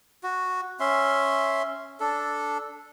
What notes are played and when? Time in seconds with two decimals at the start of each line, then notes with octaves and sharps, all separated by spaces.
0.24 F#4
0.80 C#4 E5 C6
2.00 D4 A4